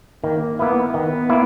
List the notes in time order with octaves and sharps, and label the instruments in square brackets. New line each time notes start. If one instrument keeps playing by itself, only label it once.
[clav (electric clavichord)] D#3 [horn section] A#3
[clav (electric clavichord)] A#3 E4 [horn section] B3
[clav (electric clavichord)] D#3 [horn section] B3
[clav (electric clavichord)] A#3 E4